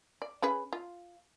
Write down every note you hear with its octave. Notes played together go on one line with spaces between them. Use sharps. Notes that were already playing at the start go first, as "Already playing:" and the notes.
D5
C#4 G#4 B4
F4